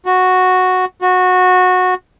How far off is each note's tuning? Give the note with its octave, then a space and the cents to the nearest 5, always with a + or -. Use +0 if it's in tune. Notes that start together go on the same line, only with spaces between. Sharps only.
F#4 -5
F#4 -15